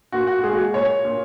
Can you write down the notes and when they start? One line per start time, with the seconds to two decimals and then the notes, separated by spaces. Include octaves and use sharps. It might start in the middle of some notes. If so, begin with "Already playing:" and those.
0.12 A#2 F#4
0.27 F#4
0.43 G#3 G#4
0.53 F#4
0.58 G#4
0.74 A#2 C#5
1.05 A#2